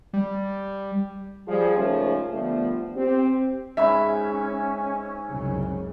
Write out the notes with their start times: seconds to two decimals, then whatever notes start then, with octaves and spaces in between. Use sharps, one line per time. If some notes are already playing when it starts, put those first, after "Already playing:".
0.13 G3
1.48 F3 G3 G#4
1.76 G#2 C#3 F3 A3 A#3 C#4
2.33 D3 F3 G3 A3 B3
2.97 C4 G4
3.77 G#2 C#4 C#5 E5 B5
5.29 C2 F#2 C#3